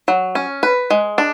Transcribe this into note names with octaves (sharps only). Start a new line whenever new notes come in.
F#3
C#4
B4
G#3
D4